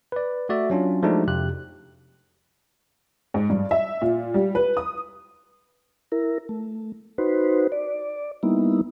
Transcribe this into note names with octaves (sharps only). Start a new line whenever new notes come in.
B4 D5
A3 F#4 D5 E5
F#3 C#4 D4 F4
F3 G#3 A3 D4 D#4 F#4
F2 C3 G4 F#6
G#2
G2
E5
A#2
G3
B4
D#6
E4 A#4
A3
D#4 F#4 B4 C5
D5
G3 A#3 B3 D#4 E4